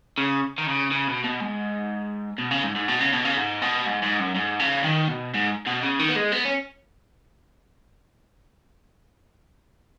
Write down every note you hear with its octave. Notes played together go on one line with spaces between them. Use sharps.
C#3
D#3
C#3
C#3
B2
B2
G#2
B2
C#3
G#2
G#2
B2
C#3
B2
C#3
G#2
B2
G#2
G#2
F#2
G#2
C#3
D#3
B2
G#2
B2
C#3
D#3
B3
G#3
B3
C#4